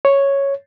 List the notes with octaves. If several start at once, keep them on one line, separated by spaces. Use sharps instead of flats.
C#5